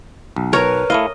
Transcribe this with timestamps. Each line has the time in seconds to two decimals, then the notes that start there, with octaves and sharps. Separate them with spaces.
0.36 B1
0.53 A#4 B4 C#5
0.90 A3 E4 D#5 F5